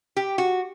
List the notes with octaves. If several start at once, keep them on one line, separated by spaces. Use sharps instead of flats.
G4
F#4